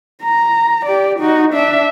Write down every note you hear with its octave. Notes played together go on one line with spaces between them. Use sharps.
A#5
G4 D5
D#4 F#4
D4 E5